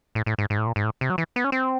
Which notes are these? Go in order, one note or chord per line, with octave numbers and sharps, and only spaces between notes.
A2
A2
G#2
G#2
A2
A#2
G#2
A2
C3
F#3
E3
B3
C#4
C4